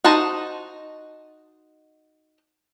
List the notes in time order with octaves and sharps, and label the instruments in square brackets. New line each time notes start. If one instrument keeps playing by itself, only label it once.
[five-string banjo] D#4 F#4 C5 D#5 A5